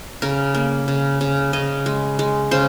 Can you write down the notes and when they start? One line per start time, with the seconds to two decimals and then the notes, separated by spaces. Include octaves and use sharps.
0.22 C#3 A#4
0.55 A#3
0.88 C#3
1.21 C#3
1.53 C#3 D#5
1.86 G#3
2.19 G#3
2.51 C#3 C5